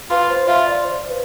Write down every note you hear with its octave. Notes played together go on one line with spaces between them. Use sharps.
F4 B4
C5
F4 E5
D5
C5
B4